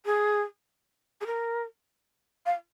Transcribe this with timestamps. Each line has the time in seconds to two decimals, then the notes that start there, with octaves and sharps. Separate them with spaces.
0.06 G#4
1.21 G#4
1.26 A#4
2.46 F5